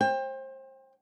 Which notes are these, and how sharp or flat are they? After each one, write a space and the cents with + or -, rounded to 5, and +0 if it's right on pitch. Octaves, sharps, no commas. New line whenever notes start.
C5 +30 G5 +25